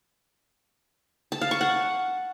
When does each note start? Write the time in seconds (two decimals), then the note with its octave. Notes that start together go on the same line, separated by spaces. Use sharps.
1.32 A5
1.41 F5
1.51 C#6
1.61 F#5